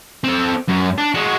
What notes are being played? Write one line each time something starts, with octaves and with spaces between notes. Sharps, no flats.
C4 A4
F#2
D4
G#3 F#4